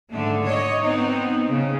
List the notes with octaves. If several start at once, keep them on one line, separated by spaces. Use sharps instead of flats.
G#2 D3 A3
C#5 D#5
B3 C4 D#4
C#3